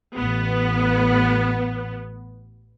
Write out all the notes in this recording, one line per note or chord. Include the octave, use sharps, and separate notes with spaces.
A1 B3